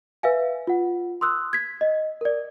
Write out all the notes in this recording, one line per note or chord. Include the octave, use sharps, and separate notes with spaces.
B4 E5 F5 G#5
F4 F#5
C6 D#6 E6 F#6
G#6 B6
D#5
A#4 D5